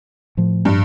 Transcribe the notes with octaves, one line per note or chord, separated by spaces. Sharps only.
A2 F3
G2